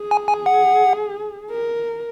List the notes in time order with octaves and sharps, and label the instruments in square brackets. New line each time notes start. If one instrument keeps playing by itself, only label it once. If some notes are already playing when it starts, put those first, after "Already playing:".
Already playing: [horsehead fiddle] G#4
[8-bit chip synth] G#5
G#5
F#5
[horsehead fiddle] A#4